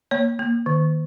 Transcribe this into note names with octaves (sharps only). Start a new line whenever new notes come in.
A#3 C#5
A#3
D#3